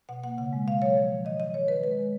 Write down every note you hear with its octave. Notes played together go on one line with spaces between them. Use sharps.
B2 F#5
A#3 F#5
C#3 F#5
G#3
B2 F5
F#3 C#5
F3
F3
D#3 D#5
D#3 D#5
D#3 C#5
D#3 B4
G#3 B4
G#3